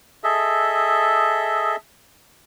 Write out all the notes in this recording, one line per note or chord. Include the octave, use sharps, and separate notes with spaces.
G#4 A4 D#5 E5